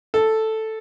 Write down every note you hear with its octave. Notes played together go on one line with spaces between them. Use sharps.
A4